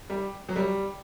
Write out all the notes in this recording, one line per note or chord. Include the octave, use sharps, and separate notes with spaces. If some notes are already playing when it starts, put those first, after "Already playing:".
G3
F#3
G3